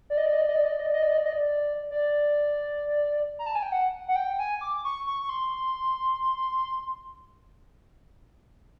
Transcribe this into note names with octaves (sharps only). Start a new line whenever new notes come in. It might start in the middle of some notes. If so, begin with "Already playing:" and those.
D5
D#5
D5
D#5
D5
D#5
D5
D#5
D5
D#5
D5
D#5
D5
D#5
D5
D#5
D5
D5
A#5
A5
G#5
G5
F#5
F#5
G5
G#5
D6
C#6
C#6
C#6
C6